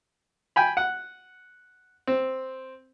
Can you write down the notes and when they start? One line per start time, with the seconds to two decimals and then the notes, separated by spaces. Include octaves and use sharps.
0.56 G5 G#5 B5
0.77 F#5
2.07 C4